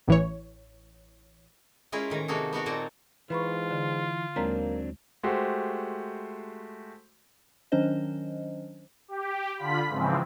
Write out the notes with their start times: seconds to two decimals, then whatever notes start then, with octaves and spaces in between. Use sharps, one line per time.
0.08 A1 E3 C#5
1.92 G#3 C#4 E4 F4 G#4 A#4
2.10 A2 D#3 E3 A#5
2.28 C3 A#3 D#4 F#4 G#4 A4
2.53 B3 D#4 F#4 A#4
2.66 A#2 A#3 C4 A5 A#5
3.30 G#2 E3 F4 B4 B5 C#6
3.71 D3
4.36 D#2 F#3 G#3 A#3 C4 D4 A#5
5.23 G#3 A3 F#4 G4 C5
7.72 D#3 F#3 C#4 D4 C5 D#5
9.08 G4
9.57 D3 F4 B5 B6
9.88 G#2 C#3 E3 F3 C4